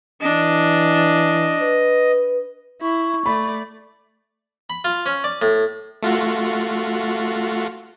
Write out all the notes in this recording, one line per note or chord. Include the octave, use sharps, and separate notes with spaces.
E3 D4 D#5
B4
E4 C#6
A3 D5 B5
B5
F4
C#4
D5
A2
A3 F4 F#4